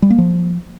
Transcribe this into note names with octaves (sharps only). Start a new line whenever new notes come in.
G3
A#3
F3